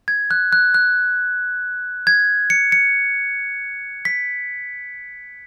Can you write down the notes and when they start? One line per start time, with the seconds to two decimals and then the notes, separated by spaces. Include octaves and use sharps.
0.08 G#6
0.31 F#6
0.53 F#6
0.74 F#6
2.07 G#6
2.50 C#7
2.72 C#7
4.05 B6